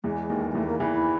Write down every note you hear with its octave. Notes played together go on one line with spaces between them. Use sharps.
E2 E3 G#3
D#2 D#3
G#3
E2 E3 A3
A#3
E2 E3 E4
E4